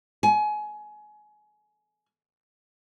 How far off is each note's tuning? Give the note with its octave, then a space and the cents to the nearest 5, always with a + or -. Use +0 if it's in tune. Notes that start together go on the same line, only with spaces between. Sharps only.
G#5 +25